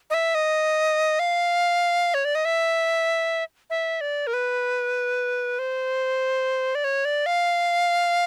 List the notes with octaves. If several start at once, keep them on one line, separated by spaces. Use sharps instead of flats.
D#5
E5
D#5
F5
C#5
D5
D#5
E5
E5
D5
A#4
B4
C5
D5
C#5
D5
F5